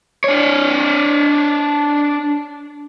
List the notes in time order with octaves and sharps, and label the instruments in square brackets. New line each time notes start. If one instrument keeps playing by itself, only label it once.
[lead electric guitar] D4 C#5